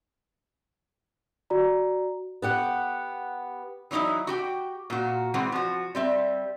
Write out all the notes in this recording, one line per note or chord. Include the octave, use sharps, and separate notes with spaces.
F#4 D5 A#5
B3 G4 F#5
E3 F#3 C#4 D#4 E4
F#4 G4 G5
A#2 F#4
E3 G#3 C4 F#5
F3 F#4
G3 C4 E5